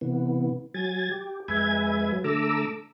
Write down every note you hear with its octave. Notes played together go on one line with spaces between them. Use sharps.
C3 E3 B3
F#3 G#5 G#6 A6
G4
F2 G#3 B4 E5 G#5 G#6
F#3
D3 A3 A4 A#5 D6 E6